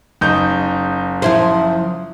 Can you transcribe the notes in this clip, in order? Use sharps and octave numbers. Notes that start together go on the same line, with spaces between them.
F#1 D#4 G6
F3 E4 C5